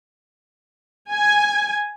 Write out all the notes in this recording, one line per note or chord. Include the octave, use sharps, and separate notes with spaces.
G#5